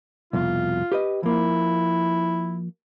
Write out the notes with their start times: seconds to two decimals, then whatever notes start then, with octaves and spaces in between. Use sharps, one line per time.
0.33 C2 F2 B2 F4
0.92 G4 B4 D#5
1.23 F3 A#3 E4